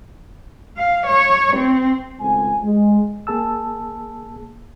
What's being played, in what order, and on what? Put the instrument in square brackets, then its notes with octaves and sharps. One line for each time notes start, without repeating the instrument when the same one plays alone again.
[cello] F5
C#5
C4
[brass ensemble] G#1 C#2 A3 C4 G#5
G#3
[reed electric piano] A#3 G#4 A5 E6